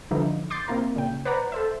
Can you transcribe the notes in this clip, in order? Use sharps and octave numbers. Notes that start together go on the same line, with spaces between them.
D3 E3 F3 G3 D#4 E4
C6 D6 G6 A6 C7
C3 A#3 E4 A#4
A#2 C#3 G5
B4 C5 D5 F#5 A#5
A4 C5 E5